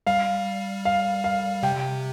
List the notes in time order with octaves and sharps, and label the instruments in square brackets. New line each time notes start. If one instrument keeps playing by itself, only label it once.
[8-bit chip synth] G3 [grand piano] F5
[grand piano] F5
F5
[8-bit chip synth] C3 [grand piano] G5